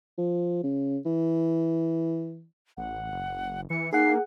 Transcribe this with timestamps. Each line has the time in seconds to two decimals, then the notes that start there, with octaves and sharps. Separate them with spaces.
0.18 F3
0.63 C#3
1.05 E3
2.77 A1 F#5
3.11 F#1
3.70 E3 C#7
3.93 A#3 D#4 G#4 F#5 C7